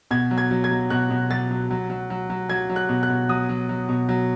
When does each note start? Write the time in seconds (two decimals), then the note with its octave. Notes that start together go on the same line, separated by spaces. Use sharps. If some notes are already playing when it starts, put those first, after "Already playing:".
0.11 B2 G#6
0.31 F#3
0.38 G#6
0.51 F#3
0.64 G#6
0.71 F#3
0.90 B2 F#6
1.10 B2
1.30 F#3 A6
1.51 F#3
1.71 F#3
1.90 F#3
2.10 F#3
2.30 F#3
2.49 F#3 G#6
2.69 F#3
2.76 F#6
2.89 B2
3.03 F#6
3.09 B2
3.29 F#3 D#6
3.49 F#3
3.69 F#3
3.89 B2
4.09 F#3